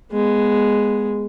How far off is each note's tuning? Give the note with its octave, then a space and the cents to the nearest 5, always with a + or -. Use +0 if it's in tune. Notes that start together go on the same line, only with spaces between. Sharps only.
G#3 +0 B3 +0